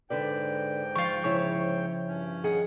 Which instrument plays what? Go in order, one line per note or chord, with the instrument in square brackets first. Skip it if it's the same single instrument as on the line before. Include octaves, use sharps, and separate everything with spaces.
[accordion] G#2 G5 [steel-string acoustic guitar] D3 B4 D5
[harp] F3 [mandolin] F4 C#6
[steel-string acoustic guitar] C#3 E4 [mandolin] C#5
[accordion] G2 C#4
[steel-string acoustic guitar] D#3 G#4 F#5